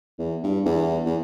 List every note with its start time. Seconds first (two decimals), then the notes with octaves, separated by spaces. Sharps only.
0.19 E2
0.43 G2
0.65 E2
1.05 E2